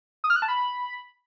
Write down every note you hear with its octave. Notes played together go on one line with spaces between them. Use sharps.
D#6
F6
F#6
A5
B5